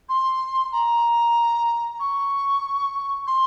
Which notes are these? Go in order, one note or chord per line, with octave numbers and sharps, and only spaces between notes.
C6
A#5
C#6
C6